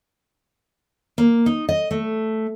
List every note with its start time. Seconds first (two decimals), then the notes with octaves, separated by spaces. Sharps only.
1.18 A#3
1.46 D#4
1.69 D#5
1.91 A3